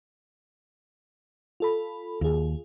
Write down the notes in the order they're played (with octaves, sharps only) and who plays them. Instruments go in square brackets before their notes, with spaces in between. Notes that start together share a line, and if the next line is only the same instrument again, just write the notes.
[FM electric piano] F4 A4 B5
[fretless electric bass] D#2 [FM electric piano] F4 G#4